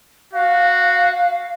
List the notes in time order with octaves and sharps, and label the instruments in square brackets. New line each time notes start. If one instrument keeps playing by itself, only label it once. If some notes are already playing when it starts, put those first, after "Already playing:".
[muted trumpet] F#4 [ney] F5